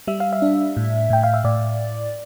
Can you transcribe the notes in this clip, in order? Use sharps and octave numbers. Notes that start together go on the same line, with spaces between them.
G3 E5
F5
E5
D4
A2
A2 G5
F5
E5
A2 D5